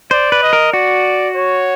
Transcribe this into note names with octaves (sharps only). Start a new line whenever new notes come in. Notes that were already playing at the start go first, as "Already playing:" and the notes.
C5 D5
B4
D#5
A#4
F#4 D5
C#5